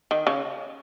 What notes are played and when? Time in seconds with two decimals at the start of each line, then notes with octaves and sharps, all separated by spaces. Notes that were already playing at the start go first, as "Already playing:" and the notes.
0.11 D#3
0.27 C#3